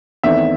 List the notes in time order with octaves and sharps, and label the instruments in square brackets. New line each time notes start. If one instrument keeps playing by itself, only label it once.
[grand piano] E2 D#3 A3 C4 E5